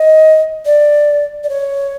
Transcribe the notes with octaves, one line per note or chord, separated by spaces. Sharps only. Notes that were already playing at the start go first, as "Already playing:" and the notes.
Already playing: D#5
D5
D5
C#5